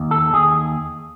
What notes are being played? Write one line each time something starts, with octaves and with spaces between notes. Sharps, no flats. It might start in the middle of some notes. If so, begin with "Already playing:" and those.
Already playing: D#2
A4
D#2 G#4